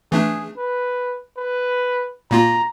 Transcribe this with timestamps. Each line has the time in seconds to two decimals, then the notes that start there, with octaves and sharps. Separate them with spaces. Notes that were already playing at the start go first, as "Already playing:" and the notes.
0.12 E3 A3 D4 G#4
0.57 B4
1.37 B4
2.31 A#2 A#3 F4 A#5